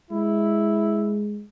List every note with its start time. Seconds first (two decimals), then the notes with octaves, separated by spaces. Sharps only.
0.11 G#3 E4